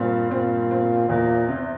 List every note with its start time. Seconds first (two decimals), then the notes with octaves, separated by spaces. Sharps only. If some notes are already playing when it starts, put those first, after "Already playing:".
Already playing: G2 A#2 C4
0.31 A#2 C4
0.71 C4
1.09 E2 A#2
1.49 C3